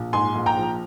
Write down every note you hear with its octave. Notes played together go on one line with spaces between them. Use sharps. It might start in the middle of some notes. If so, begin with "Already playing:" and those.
Already playing: A#1
G#2 G#5 C6
A#1
G5 A#5
F3